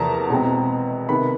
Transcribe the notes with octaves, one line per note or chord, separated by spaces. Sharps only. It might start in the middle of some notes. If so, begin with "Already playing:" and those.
Already playing: E2 C3 F3 A#3 A5 A#5
B2 G#3 C4
C3 D#3 G#3 B3 B5